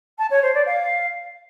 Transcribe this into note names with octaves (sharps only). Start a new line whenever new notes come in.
A5
C#5
C5
D5
F5